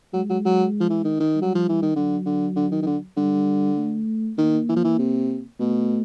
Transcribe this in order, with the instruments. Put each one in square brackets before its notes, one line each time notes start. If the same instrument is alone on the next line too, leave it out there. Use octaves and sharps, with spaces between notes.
[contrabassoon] F#3 [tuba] G#3
[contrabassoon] F#3
F#3
F3
E3
D#3
D#3
[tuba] G3
[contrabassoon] F#3
F3
E3
D#3
[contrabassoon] D3 [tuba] F#3
[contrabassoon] D3
D3
D#3
D#3
D3
[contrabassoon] D3 [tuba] G3
[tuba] A3
[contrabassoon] D#3 [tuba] A#3
[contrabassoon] E3
F3
E3
C3
[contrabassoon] B2 [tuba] A3